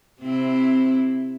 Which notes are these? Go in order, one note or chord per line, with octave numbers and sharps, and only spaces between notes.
C3 C4 E4